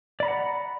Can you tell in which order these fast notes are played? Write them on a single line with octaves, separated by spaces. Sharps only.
D5 B5 A#5 F#5